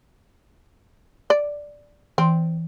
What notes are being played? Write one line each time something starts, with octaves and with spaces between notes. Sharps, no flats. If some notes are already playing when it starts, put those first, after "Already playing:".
D5
E3 C4